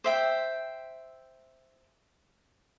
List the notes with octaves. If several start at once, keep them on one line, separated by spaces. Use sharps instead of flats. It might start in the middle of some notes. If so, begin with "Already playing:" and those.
C5 E5 G5